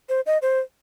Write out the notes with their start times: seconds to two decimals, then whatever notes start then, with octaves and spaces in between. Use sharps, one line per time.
0.09 C5
0.26 D#5
0.42 C5